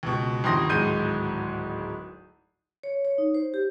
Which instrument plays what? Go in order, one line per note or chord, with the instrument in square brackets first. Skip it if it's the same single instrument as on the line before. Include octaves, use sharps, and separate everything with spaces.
[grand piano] C#2 B2
G1 D#2 C6 D#6 A#6
D1 G#1 G#3 G6 D#7
[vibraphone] C#5
C#5
D#4
C5
G4